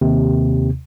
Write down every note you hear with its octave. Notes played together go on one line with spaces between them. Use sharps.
D#2 C3